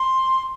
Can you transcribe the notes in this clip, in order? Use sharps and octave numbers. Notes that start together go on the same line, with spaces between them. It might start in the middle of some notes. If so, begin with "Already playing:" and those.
Already playing: C6